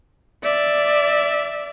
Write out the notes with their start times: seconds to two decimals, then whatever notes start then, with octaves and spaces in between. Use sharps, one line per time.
0.43 D5 E5